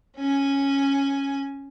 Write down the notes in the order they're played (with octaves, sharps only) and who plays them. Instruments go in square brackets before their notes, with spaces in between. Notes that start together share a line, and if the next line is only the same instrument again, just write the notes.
[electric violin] C#4 G#5